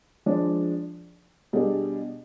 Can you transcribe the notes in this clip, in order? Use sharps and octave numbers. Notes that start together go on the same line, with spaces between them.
F3 G#3 D4
B2 G3 D4 G#4